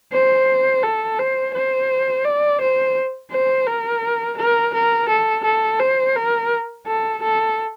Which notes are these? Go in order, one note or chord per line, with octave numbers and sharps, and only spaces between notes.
C5
A4
C5
C5
D5
C5
C5
A#4
A#4
A#4
A4
A4
C5
A#4
A4
A4